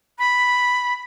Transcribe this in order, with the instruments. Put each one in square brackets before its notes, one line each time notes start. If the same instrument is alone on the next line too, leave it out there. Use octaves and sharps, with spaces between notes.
[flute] B5